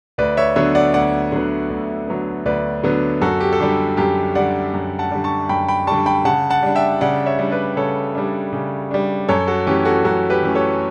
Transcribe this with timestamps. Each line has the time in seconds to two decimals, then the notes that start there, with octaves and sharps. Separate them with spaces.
0.18 D2 B4 D5
0.37 C#5 E5
0.56 D3 F#3 B3 C#5 E5
0.75 D5 F#5
0.94 D2 D5 F#5
1.32 D3 F#3 B3
1.70 D2
2.08 D3 F#3 B3
2.45 D2 B4 D5
2.84 D3 F#3 B3
3.21 F#2 F#4 A4
3.40 G4
3.53 A4
3.60 D3 G3 G4
3.97 F#2 G4
4.35 D3 G3 D5 F#5
4.73 F#2
4.99 F#5 A5
5.11 D3 G3
5.24 A5 C#6
5.49 F#2 G5 B5
5.68 G5 B5
5.87 D3 G3 A5 C#6
6.06 G5 B5
6.25 C#3 F#5 A5
6.50 F#5 A5
6.63 G3 D4
6.75 E5 G5
7.01 C#3 D5 F#5
7.26 C#5 E5
7.39 G3 D4
7.51 B4 D5
7.77 C#3 A4 C#5
8.15 G3 D4
8.53 C#3
8.91 G3 D4
9.28 F#2 A4 C#5
9.47 F#4 A4
9.67 E3 A3 C#4 G4
9.85 F#4 A4
10.04 F#2 F#4 A4
10.30 G4 B4
10.43 E3 A3 C#4
10.55 A4 C#5